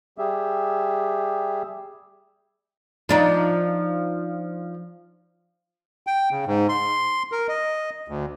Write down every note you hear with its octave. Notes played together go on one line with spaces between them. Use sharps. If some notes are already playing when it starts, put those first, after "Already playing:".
G3 G4 G#4 E5
F3 D4 D#4
G5
C#3
G#2
C6
A#4
D#5
D2